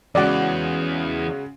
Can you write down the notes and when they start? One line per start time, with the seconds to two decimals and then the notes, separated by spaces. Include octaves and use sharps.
0.15 E2 C#3 G#3 F#4 D5